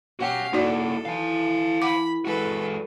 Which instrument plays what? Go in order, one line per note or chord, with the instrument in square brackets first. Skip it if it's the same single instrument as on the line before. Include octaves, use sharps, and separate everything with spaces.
[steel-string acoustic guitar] B2 C#4 F#5 [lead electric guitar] F#4 C#5 [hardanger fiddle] G4 F5
[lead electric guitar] A#3 E4 [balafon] D#4 F#4 D5 [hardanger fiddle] A4
[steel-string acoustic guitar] E3 [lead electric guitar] F5 A5
[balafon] F#5 D6 [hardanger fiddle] B5
[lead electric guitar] G#3 F#4 [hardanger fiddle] A4 B4